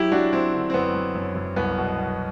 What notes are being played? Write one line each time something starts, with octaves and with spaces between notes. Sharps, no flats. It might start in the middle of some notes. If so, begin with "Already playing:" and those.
Already playing: F#3 E4 G4
F#3 D4 F#4
F#3 C4 E4
D3
C4
F#2 B3
F#3
F#2
F#2
C2 B3
B2
B2